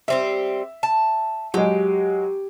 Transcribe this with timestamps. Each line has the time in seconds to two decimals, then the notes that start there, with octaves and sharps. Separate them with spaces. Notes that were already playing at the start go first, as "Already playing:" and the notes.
0.08 G3 C4 G4 E5
0.83 A5
1.54 F#3 G#3 G4